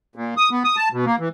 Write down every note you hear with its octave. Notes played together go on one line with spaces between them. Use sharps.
A#2
D#6
B3
D#6
A5
B2
A#3
E3